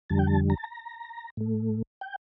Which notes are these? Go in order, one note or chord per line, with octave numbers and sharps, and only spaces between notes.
F2 D3 G3 A5
G5
A5
A#5
A5
A#5
A2 A3
G5